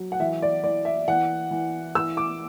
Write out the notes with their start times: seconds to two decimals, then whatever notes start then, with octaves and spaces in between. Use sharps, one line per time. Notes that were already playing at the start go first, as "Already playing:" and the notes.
Already playing: F#3
0.12 F#5
0.20 E3 E5
0.42 D5
0.64 E3 D5
0.85 E5
1.08 E3 F#5
1.51 E3
1.95 E3 E6
2.17 D6